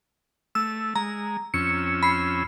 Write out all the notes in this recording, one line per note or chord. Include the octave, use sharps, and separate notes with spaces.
A3 E6
G#3 A#5
F2 C#4 E6 C#7
B5 C7